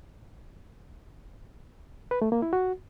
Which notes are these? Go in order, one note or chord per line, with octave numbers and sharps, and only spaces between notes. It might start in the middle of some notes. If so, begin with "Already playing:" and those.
B4
A3
A#3
E4
F#4